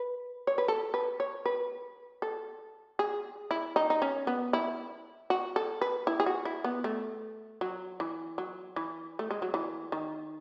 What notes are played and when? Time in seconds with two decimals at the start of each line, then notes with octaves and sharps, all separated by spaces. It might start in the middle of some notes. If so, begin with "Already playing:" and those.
Already playing: B4
0.47 C#5
0.58 B4
0.68 A4
0.94 B4
1.20 C#5
1.45 B4
2.22 A4
2.99 G#4
3.51 E4
3.76 D#4
3.90 D#4
4.02 C#4
4.27 B3
4.53 E4
5.30 F#4
5.56 A4
5.81 B4
6.07 E4
6.20 G#4
6.26 F#4
6.45 E4
6.64 B3
6.84 A3
7.61 F#3
8.00 E3
8.38 F#3
8.76 E3
9.19 A3
9.31 G#3
9.42 F#3
9.54 E3
9.92 D#3